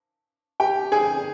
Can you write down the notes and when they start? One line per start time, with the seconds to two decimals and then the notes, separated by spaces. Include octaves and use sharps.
0.60 G4 G5
0.92 G#4 G#5